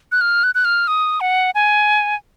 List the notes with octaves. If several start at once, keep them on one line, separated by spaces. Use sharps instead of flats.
F#6
F6
F#6
F#6
F6
D#6
F#5
G#5